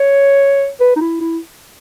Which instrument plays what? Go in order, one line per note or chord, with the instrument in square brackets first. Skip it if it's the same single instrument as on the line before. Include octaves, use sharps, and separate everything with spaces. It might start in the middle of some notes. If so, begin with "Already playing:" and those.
Already playing: [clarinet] C#5
B4
D#4
E4
E4